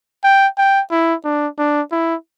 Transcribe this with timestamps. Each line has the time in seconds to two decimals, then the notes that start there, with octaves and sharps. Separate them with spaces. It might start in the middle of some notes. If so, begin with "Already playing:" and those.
0.24 G5
0.58 G5
0.91 E4
1.24 D4
1.58 D4
1.92 E4